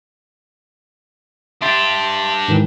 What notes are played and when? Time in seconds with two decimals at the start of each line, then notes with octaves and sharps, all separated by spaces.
1.62 D4 G4 E5 C6 A6
2.48 G#2 D#3 E3